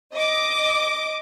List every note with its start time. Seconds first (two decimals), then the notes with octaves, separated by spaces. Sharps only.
0.13 D#5 D6